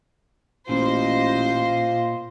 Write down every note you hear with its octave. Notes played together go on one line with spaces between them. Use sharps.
A1 A#2 F4 C5 D#5